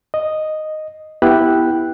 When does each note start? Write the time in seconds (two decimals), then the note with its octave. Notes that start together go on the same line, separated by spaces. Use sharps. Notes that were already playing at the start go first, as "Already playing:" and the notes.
0.14 D#5
1.22 B3 E4 G4 G5 F#6